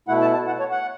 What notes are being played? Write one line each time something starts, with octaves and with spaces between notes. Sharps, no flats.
B2 A3 E4 F#5
A5
A5
F#5
C#5
F#5